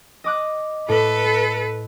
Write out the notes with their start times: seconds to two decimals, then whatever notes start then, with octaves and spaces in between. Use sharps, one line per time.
0.24 D#5 D6 F#6
0.89 A2 A4 B4